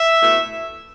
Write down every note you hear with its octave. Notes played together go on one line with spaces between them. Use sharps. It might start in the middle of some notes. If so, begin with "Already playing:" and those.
Already playing: E5
B2 A3 E4